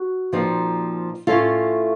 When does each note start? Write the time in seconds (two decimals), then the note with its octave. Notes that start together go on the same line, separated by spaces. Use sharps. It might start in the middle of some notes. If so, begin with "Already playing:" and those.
Already playing: F#4
0.33 A#2 F3 C4 D#4
1.27 A2 A3 C#4 F4 A4